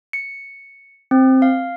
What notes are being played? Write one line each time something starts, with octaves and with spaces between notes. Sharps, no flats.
C#7
C4
F5